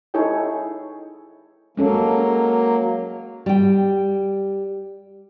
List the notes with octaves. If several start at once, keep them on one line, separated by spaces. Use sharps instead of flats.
D#4 E4 G#4 A4 C#5 G5
F#3 G#3 A#3 C#4 A4
G3 G5